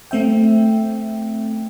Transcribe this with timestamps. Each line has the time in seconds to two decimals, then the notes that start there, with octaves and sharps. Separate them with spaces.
0.11 A3 C4 E5 G5